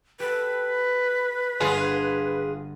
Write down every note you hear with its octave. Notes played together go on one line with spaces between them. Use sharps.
G4 A4 B4
G1 F4 G#4